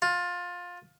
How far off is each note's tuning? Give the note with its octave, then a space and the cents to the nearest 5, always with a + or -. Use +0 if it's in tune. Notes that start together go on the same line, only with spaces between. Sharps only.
F4 +20